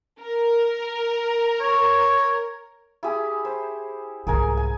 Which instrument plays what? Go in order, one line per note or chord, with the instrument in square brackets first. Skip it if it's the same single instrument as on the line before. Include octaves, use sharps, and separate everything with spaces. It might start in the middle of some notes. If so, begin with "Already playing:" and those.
[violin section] A#4
[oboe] C#5
[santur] E4 G4 G#4
C5
[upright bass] C2 G#2 [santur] G#4 A#4 G#5
[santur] G#5